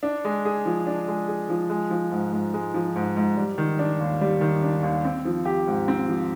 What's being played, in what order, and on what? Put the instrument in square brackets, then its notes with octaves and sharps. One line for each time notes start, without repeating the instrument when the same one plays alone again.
[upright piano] D4
G#3
G#4
F3
D4
G#3
G#4
F3
G#3
F3
G#2
G#2
G#3
F3
G#2
G#2
G3
D#3
D4
D#2
G3
D#3
D4
D#2
C4
F3
G4
G#2
C4
F3